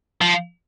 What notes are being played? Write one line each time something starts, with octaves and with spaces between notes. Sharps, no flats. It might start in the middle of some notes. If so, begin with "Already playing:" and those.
F3